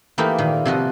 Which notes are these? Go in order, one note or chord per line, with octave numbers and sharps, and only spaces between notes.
E3 A3 A#3 D#4 E4 G4
A#2 D#3
C3 F3 F#4 D#5